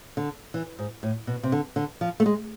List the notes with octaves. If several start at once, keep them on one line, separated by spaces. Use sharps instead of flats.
D3
E3
G#2
A2
B2
C3
D3
D3
F3
A3
G#3